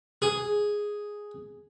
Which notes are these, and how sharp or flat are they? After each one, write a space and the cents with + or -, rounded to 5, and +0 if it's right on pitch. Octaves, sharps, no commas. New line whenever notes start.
G#4 +0